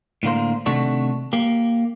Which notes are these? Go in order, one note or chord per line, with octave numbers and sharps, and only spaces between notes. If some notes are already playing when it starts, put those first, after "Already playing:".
A2 D3 A#3 C5
C3 D#3 A3 D4 F#4
A#3 G4